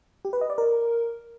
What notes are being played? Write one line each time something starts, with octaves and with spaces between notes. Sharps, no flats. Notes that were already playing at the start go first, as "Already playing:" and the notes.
G4
B4
D#5
D5
A#4